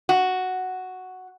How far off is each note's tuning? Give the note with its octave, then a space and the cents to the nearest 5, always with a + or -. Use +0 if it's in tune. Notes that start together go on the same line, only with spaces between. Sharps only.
F#4 +0